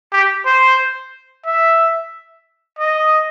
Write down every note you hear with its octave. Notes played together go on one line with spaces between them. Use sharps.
G4
C5
E5
D#5